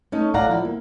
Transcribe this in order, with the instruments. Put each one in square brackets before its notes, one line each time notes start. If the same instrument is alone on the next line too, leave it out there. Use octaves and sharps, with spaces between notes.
[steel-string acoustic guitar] A3 C#4 D#4
A2 D5 F5 F#5 A#5
F3 E4
A#3